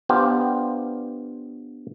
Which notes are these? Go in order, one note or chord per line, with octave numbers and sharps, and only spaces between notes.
B3 D4 F4 G4 C5